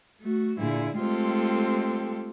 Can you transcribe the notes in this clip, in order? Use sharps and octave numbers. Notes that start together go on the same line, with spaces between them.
A3 F#4
A#2 D3 E4 G#4
G#3 A3 C4 F4 G4 A4